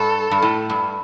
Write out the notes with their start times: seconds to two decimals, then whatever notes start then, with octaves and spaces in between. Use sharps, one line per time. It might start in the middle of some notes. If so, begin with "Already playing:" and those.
Already playing: G2 A4
0.31 G2
0.42 A2
0.70 G2